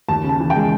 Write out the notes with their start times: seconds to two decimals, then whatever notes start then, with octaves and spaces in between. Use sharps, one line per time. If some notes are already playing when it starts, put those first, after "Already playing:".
0.09 D#2 A5
0.24 C#3
0.29 A5
0.40 E3
0.50 G5
0.56 G#3